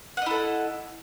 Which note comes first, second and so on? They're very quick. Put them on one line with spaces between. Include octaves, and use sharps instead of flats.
F#5 D#5 E4 A4